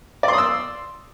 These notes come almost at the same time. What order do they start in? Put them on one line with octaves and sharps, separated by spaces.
D5 C6 D#6 E6